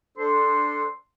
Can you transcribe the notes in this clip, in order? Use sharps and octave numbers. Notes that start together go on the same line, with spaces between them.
D4 A4 C5 C6